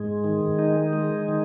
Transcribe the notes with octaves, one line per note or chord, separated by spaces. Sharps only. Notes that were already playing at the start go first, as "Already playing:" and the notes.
Already playing: G#2 G#3
D#3
D#4
G#3
D#3